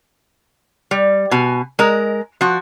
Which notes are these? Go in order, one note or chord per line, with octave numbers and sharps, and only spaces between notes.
G3
B2 G#5
G#3 A#4
F3 F#4